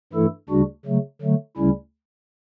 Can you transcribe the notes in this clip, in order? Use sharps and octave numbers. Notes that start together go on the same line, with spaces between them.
G2 E3 A3 E4 A4
D2 C#3 G3 D4 F#4
C#3 F#3 A3
D3 F#3 A3
D2 C#3 G3 C#4 E4